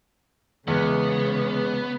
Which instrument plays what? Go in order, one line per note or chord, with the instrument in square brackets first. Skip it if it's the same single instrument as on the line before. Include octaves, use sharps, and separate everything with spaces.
[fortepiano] E2 [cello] C#3 [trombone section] G#3 [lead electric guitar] B3